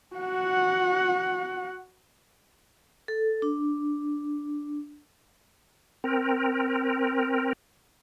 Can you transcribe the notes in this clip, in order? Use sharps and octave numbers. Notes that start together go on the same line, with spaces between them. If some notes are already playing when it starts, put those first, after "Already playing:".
F#4 F#5
A4
D4
C4 A#4